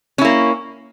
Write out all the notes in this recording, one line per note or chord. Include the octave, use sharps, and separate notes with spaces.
A#3 C#4 E4